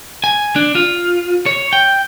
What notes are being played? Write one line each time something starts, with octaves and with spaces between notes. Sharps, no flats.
G#5
D4
F4
C#5
G5